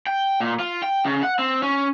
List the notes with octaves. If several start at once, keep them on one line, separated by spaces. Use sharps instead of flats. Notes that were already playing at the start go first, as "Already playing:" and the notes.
G5
A#2
F4
G5
C#3
F#5
C4
C#4